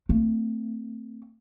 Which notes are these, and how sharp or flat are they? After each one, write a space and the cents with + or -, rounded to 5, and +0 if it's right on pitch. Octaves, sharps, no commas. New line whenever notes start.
A3 +30 C4 +0